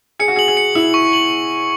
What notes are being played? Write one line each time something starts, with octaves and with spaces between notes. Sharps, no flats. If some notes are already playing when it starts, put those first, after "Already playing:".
G#4 C#7
F#4
G#4 F#7
G#4
C#7
E4 F#7
C#6
F#7